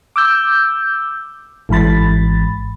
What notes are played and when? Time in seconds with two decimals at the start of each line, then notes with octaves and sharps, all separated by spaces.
0.16 D6 E6 G6
1.69 G#1 G#2 E3 B5 A6